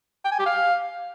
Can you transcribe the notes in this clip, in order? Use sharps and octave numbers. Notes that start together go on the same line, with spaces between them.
G5
G#5
G4
F5